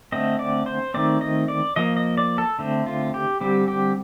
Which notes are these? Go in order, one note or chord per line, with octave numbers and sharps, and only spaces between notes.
D3 A3 C4 D#5
D5
C5
D#3 A3 C4 D5
D#5
D5
F3 A#3 D#5
D#5
D5
A4
D3 A3 C4
F4
G4
D3 G3 C4 G4
G4